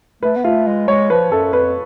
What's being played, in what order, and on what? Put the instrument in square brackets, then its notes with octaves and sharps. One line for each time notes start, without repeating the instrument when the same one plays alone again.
[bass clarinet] A3 [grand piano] B4
[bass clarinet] B3
[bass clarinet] A3 [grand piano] F4
[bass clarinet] G#3
[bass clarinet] G#3 [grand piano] C#5
[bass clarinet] F3 [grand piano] B4
[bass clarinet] F#2 [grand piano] A4
[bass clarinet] F2 [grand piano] B4